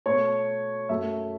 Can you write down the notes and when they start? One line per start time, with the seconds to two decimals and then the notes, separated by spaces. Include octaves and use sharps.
0.06 B2 A3 C#5
0.89 F#2 F#3 A3 E5